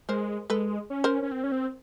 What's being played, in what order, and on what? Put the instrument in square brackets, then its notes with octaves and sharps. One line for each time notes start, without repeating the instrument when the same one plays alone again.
[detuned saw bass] G#3 [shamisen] A#4 C5
[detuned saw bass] G#3 [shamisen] A4 B4
[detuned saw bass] C#4
[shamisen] A#4 C5
[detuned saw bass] C#4
C4
C#4
C4